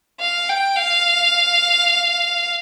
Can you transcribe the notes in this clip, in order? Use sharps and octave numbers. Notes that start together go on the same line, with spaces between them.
F5
G5
F5